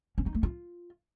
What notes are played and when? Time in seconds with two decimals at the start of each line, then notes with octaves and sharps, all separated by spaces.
0.18 C#4
0.26 D#4
0.35 A3
0.43 F4